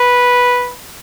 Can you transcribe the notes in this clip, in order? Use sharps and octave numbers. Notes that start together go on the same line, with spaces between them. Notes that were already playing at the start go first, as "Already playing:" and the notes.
Already playing: B4